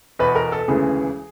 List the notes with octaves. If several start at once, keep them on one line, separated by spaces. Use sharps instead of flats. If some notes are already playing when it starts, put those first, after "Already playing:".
E2 B2 B4
A#4
A4
E1 D2 C#3 E3 G#4